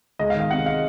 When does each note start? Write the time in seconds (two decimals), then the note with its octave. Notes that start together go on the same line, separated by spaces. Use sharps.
0.19 C#2 D#5
0.30 F5
0.35 D#3
0.40 F5
0.51 C3 F#5
0.66 F5